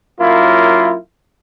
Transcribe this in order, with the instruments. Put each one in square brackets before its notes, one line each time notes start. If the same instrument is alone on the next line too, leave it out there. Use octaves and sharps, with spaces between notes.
[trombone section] F#2 F#3 A#3 E4 F4